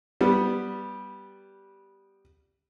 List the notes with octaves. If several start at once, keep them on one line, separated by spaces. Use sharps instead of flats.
G3 B3